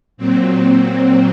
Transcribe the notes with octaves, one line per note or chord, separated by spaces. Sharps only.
A#2 F#3 C4